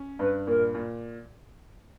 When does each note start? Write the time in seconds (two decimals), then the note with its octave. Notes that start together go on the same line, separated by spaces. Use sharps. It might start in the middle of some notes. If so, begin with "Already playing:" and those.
Already playing: C#4
0.19 G2 B4
0.47 A#2 A#4
0.74 A#2